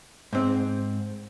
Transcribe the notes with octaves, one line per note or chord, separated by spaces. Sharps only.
G#2 C4